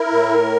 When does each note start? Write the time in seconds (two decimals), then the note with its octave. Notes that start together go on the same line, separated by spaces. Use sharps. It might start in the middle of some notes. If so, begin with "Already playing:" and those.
Already playing: E4 A#4
0.12 A2